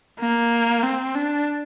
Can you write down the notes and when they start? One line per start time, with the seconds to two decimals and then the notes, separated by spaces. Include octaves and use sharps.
0.20 A#3
0.83 C4
1.15 D4